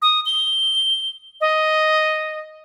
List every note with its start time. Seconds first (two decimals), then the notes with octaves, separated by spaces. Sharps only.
0.02 D#6
0.26 G7
1.41 D#5